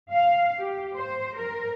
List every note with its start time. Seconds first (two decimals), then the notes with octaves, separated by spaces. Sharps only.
0.10 F5
0.59 G4
0.95 C5
1.37 A#4